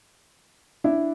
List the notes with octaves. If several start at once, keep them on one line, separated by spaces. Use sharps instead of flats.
D4 E4